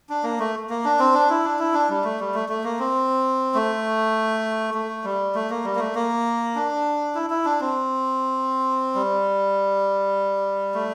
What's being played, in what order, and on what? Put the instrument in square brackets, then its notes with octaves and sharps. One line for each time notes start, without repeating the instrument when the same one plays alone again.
[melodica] D4
A#3
A3
A#3
D4
C4
D4
E4
D4
E4
D4
G3
A3
G3
A3
A3
A#3
C4
A3
A3
G3
A3
A#3
G3
A#3
A3
A#3
D4
E4
E4
D4
C4
G3
A3